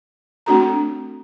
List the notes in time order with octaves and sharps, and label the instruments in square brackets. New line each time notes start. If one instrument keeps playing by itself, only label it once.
[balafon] A3 C4 D4 F#4 A4 A#5